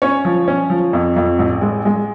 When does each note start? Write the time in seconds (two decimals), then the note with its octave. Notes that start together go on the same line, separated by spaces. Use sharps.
0.02 C#4 C#5
0.25 F3
0.48 C#4
0.70 F3
0.93 F2
1.16 F2
1.39 A1
1.61 G#3
1.85 G#3